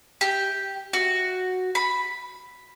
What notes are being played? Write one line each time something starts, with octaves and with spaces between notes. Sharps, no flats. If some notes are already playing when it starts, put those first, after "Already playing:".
G4
F#4
B5